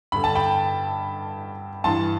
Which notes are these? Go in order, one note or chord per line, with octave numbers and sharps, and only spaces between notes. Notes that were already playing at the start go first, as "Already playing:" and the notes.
G2 D3 B5
A5
G5 B5
G2 E3 A5 C6